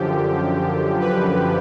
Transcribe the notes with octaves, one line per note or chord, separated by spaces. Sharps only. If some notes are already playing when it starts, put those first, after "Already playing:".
Already playing: F#2 D3 F3 G4
B4